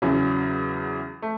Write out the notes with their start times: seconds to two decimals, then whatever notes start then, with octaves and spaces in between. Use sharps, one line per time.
0.02 E2 C#3 F#3 C#4 E4
1.22 A3